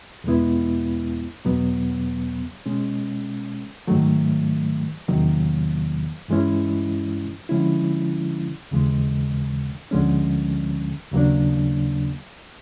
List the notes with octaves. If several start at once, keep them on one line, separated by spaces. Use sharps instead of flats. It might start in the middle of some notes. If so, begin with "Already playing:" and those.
E2 B2 G#3 B3 E4
E2 B2 F#3 B3
B2 G#3 C#4
G#2 D#3 F#3 A3
E2 C3 D#3 F#3 A#3
G2 E3 G#3 C#4 E4
D3 F3 G#3 C#4 E4
D#2 C#3 E3 G#3
D2 D3 F3 G#3 C#4
D#2 C#3 F#3 A#3 D4